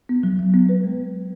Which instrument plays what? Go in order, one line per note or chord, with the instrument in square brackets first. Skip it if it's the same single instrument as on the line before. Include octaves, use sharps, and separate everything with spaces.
[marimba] B3
F#3
F#3
B3
B4
G#3